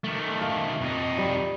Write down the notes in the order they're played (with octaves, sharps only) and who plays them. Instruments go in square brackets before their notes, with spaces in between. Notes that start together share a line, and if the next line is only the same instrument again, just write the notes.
[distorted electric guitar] D#3 A3
[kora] F5
[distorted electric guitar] F2 D#4
[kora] G3